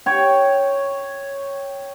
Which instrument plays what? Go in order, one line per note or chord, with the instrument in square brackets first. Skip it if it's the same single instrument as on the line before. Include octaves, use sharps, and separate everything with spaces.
[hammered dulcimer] C#5 G5